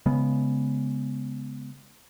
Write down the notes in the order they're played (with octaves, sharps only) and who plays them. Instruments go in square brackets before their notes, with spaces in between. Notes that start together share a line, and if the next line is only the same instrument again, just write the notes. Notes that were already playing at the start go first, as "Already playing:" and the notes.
[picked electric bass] C#3 G#3 B3